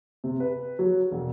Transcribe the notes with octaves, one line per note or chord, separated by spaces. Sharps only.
C3
B4
F#3
E1